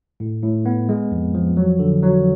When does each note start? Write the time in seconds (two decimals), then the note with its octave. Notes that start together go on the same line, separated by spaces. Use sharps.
0.20 A2
0.43 A2
0.65 B3
0.89 G#3
1.12 F2
1.34 F3
1.57 F#3
1.79 D3
2.03 F#3